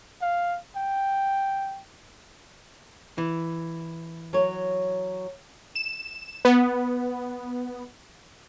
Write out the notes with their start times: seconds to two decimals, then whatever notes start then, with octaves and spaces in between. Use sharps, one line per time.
0.22 F5
0.76 G5
3.18 E3
4.33 F#3 C#5
5.75 E7
6.45 B3